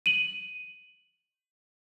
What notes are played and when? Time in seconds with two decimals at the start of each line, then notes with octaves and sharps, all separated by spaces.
0.06 D#7 F#7